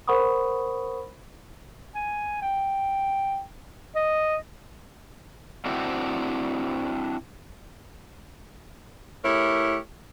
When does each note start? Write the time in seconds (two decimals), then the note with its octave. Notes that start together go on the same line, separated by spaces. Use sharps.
0.08 A#4 C5 F#5 B5 C#6 D#6
1.95 G#5
2.42 G5
3.95 D#5
5.66 C4 D4 E4 F#4 C5
9.24 A3 E4 G4 A#4 C#5